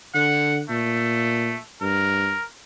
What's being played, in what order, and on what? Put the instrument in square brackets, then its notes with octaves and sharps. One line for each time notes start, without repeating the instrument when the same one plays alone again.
[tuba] D3 [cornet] F#5
[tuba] A#2 [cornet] A3
[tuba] G2 [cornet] A#4